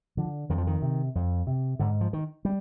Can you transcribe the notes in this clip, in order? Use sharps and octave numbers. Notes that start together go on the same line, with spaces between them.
D3 F3
F2 D#3
F3
D#3
C3
F2
C3
G#2 D3
F3
D#3
G3